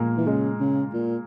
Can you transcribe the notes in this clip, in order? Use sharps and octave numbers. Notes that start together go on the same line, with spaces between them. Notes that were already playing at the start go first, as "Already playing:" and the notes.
Already playing: A#2 G#3 A#3
E3
C#3 G#3
C#3
A#2